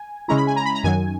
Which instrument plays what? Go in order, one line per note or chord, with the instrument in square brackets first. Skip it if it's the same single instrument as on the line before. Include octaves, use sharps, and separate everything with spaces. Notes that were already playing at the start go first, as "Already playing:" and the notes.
Already playing: [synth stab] G#5
C#3 G#3 C#4 E4 A#5
B5
G#5
A#5
B5
A#5
F#2 D#3 F#3 G#5